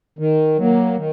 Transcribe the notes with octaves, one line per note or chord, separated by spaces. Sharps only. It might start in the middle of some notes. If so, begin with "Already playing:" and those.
D#3
F#3 A#3
D#3